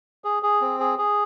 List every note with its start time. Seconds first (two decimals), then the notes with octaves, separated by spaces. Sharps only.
0.24 G#4
0.43 G#4
0.61 C4
0.80 G#4
0.98 G#4